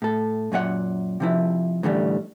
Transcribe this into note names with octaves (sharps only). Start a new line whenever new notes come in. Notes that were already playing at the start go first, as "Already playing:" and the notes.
A2 A4
F#2 A#2 F#4 F#5
C3 F3 E4
A2 D3 E3 G3